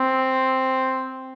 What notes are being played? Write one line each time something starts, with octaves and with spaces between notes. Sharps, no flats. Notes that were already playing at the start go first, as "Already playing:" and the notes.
Already playing: C4